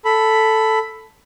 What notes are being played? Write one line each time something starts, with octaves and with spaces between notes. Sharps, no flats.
A4 B5